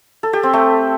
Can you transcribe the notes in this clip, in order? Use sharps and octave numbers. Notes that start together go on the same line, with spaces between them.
A4
G4
C4
A3